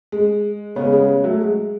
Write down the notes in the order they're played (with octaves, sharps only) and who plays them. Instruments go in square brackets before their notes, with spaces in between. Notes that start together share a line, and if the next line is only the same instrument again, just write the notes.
[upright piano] G#3
[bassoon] C#3 [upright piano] G#3 B3
[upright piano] G#3
G#3
F#3 A3
G#3